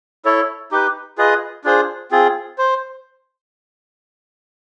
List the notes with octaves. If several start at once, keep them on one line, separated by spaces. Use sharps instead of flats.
E4 A4 C#5
D#4 G4 B4
F4 G#4 B4 D#5
D4 F4 G#4 C5
C4 F4 G#4
C5